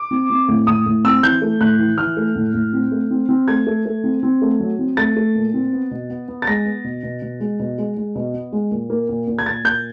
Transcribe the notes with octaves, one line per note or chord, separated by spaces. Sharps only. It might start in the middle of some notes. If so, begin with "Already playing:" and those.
Already playing: D6
C4
C4
A2
A2 D#6
A2
C4 E6
E3 G6
A3
A2 F#6
E3
E3 F6
A3
A2
A2
C4
A3
C4
C4
A3 G#6
A3
A3
C4
C4
A3
F#3
C4
A3 A6
A3
A#2
C4
B3
B2
B3
B3
A6
G#3 A#6
B3
B2
B2
B2
G#3
B2
G#3
G#3
B2
B3
G#3
A#2
A#3
A#2
A#2
G#6
A#2 A6
A#2 G6